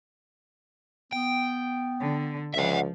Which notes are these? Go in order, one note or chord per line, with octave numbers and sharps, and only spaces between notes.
B3 G5
D3
C#2 F3 E5 F#5